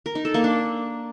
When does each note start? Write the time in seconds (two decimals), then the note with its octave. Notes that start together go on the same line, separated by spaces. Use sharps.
0.06 A#4
0.15 D#4
0.25 A4
0.34 A#3
0.44 D4